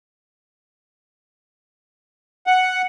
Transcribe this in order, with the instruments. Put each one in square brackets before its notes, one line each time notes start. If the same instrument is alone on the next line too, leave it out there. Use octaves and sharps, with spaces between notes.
[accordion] F#5